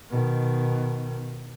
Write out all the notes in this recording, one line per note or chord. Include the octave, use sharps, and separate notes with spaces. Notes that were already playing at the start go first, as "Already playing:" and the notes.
B2 D#3